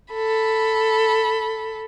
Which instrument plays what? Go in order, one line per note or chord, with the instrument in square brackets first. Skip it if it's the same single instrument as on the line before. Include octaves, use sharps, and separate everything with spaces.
[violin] A4 B5